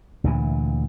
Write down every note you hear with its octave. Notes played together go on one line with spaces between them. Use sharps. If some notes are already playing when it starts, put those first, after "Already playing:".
D2 A#2 E3